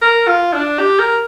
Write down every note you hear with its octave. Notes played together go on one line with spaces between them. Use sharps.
A#4
F4
D4
G4
A#4